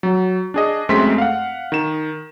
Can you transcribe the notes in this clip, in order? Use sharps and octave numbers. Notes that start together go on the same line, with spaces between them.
F#3
D4 G#4 D#5
F#2 G#3 A3 C4 C6 B6
F5 F#5
D#3 E7